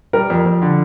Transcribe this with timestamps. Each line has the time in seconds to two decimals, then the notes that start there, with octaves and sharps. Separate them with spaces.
0.13 G3 A#4
0.30 F2
0.46 F2
0.62 D3